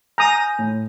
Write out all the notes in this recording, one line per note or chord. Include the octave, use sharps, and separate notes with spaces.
G#5 A#5 D#6 G6
A2